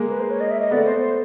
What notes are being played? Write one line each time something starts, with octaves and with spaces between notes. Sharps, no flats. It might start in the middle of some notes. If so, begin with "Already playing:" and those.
Already playing: G#3 A#3
B4
C5
C#5
D#5
E5
D#5
A3 B3 D5
C5
C5